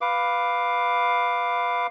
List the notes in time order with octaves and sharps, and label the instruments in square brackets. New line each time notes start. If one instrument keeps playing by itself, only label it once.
[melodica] B4 F5 D6